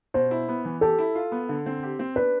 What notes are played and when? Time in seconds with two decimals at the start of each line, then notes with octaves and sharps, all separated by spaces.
0.14 B2 C5
0.31 E4
0.48 B3
0.65 E3
0.81 G4 A4
0.98 E4
1.15 F4
1.32 B3
1.49 D3
1.66 C4
1.83 G4
1.99 C4
2.16 D4 B4